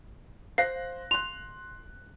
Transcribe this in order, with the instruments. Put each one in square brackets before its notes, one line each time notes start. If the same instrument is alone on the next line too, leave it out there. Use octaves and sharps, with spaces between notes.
[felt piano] C5 F#6 A#6 [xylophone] F5
[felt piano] C6 F#6 [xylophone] F7